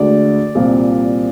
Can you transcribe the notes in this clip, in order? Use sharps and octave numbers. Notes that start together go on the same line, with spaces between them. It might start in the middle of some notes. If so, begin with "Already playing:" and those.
Already playing: D2 D3 G#3 D5
C2 A#2 F3